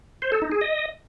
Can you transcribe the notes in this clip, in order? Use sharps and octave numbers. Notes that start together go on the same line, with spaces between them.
C5
A4
D#4
G#4
D#5